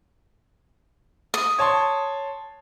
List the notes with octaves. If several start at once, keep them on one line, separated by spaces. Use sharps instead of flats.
D#6
C#5 A5 C6